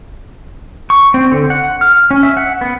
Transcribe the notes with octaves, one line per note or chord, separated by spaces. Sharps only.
C#6
C4
D3
F#5
F6
C#4
E5
F#5
B3